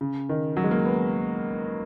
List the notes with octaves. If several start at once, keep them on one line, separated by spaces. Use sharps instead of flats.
C#3
D#3
F#3
G#3
A#3
B3